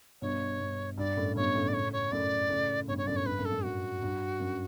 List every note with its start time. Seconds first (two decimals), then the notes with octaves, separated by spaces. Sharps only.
0.22 G2 B2 C#5
0.60 G2
0.98 G2 D5
1.17 F#2 A2
1.36 G2 B2 C#5
1.55 A2 C#3
1.68 D5
1.74 C#5
1.93 C#5
2.12 F#2 A2 D5
2.50 A2 C#3
2.88 G2 B2 C#5
2.98 C#5
3.06 F#2 A2 D5
3.16 C#5
3.26 G2 B4
3.38 F#2 A2
3.45 A4
3.52 F#2
3.64 F#2 F#4
4.02 G2
4.40 F#2